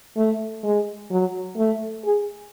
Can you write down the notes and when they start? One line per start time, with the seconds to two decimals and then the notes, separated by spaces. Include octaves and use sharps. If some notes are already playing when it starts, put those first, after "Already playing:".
0.17 A3
0.63 G#3
1.11 F#3
1.57 A3
2.05 G#4